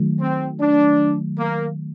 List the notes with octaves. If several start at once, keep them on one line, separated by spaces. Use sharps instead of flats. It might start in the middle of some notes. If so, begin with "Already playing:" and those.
Already playing: D#3 F#3 A3
C4
D4
A#3